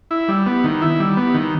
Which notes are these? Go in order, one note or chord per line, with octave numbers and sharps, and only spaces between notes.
E4
G3
B3
D#3
E4
G3
B3
D#3